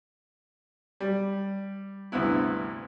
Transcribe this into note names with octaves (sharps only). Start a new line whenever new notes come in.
G3
D2 G2 C3 B3 E4